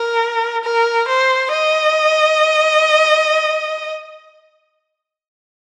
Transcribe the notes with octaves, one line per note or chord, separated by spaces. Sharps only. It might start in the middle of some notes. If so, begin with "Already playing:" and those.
Already playing: A#4
A#4
C5
D#5